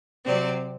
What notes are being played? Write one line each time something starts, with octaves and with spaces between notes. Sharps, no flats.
C3 F#3 C4 G4 D5